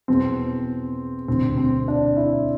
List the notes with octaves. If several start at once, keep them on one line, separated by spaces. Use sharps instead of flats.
E2 B2 C4
E1 D2 C3 E3 C4
C4
D4
E4